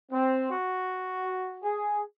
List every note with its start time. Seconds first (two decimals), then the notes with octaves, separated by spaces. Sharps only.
0.12 C4
0.50 F#4
1.62 G#4